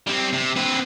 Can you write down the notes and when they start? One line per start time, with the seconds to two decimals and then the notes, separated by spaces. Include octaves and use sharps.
0.07 G3 C4
0.33 C3
0.56 C4 B4